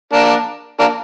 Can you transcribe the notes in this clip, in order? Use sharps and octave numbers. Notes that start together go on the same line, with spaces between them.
A#3 D4
A#3 D4